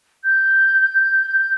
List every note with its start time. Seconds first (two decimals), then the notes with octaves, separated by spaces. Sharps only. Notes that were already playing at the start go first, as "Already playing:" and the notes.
0.24 G6